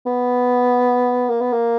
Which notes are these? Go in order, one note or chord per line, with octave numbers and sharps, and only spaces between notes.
B3
A#3
B3
A#3